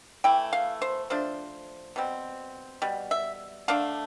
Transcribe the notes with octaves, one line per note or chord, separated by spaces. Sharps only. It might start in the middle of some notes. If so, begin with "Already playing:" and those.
E3 A3 E4 G5
F5
C5
F3 A3 D4 C5
B2 G3 C4
B2 G3
E5
D3 A3 D4 F5